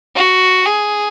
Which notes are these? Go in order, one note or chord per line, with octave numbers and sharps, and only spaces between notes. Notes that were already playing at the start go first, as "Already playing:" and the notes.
F#4
G#4